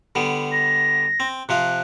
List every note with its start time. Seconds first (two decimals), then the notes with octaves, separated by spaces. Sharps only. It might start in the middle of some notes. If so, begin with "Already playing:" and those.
0.15 D3 G3 B3
0.52 A#6
1.20 C4
1.49 C3 F3 F5 F#6